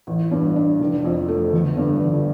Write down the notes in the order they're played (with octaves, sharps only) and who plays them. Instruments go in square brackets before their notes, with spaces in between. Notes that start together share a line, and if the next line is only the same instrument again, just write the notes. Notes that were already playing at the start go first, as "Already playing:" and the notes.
[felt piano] A1
G2
D4
F1
F2
A3
G1
G2
G1